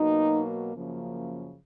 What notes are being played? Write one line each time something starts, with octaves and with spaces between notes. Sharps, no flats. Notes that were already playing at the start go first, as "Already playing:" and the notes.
Already playing: B2 F#3 A#3 D#4
F#2 C#3 F3 A#3